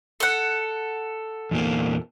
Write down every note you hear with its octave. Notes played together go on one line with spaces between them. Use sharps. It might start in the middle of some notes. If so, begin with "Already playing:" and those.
A4 F#5
E2 A#2 A#3